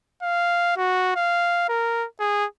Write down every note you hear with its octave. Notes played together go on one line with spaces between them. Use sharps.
F5
F#4
F5
A#4
G#4